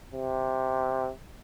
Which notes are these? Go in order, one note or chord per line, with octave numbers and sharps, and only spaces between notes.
C3